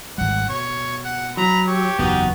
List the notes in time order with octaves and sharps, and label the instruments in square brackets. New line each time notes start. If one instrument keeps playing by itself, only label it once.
[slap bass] G#1 G3 [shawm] F#5
[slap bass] B2 [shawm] C#5
[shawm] F#5
[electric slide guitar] F#3 [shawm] A#5 [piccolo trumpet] B5
[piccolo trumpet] G4 [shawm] C#5
[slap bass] F#1 E2 [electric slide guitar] B3 F#4 [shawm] D#4